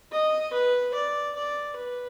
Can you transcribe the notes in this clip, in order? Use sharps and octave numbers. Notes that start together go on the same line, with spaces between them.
D#5
B4
D5
D5
B4